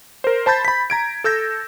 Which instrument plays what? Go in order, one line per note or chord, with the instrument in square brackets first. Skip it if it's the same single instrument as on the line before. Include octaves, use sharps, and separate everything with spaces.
[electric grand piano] A#4 C5
C5 A5 B5 G6 A6
B5 B6
A#5 G#6 D7
A4 E6 G6 A#6